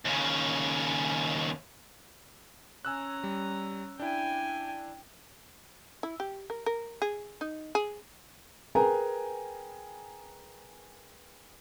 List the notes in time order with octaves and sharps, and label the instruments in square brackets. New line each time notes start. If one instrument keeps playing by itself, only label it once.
[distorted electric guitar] D#2 C#3
[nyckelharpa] C#4 A#5 [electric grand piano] G#5 E6 F#6
[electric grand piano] G3
[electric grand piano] D4 E4 [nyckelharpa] G5 G#5
[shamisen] E4
G4
A#4
A#4
G#4
D#4
G#4
[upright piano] G#4 A#4 B4 G5 G#5 A#5